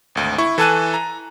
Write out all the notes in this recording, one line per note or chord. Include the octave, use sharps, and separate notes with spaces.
G#1 D2
E4 C#6
E3 A4 G#5 A5 F#6 D#7
A#5